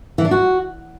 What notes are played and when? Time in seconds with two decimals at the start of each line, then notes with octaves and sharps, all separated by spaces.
0.18 E3
0.25 D4
0.31 F#4